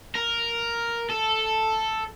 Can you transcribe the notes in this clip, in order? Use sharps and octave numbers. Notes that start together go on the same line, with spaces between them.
A#4
A4